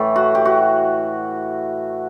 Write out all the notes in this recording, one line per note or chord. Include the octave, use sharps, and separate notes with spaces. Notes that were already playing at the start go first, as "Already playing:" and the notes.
Already playing: A2 E3 A3
F#4
G4
F#4